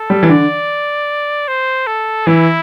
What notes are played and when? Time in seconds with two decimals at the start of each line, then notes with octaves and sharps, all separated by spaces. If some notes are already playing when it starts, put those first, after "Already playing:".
Already playing: A4
0.10 G3
0.23 E3
0.28 D3 D5
1.48 C5
1.87 A4
2.27 E3 E4